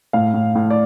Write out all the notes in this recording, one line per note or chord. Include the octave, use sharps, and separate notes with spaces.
A2 F5
A2
A2
D5